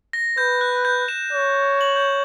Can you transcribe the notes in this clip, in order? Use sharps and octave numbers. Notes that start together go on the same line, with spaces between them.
A#6
B4 G6
F#6
G6
E7
C#5
F#7
G6